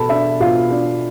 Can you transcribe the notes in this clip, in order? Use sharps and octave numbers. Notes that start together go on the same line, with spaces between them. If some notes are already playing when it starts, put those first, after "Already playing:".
Already playing: B2 A4 A5 B5
D4 E5
B2 F4 F5
D4